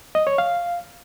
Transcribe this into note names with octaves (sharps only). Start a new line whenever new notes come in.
D#5
C#5
F5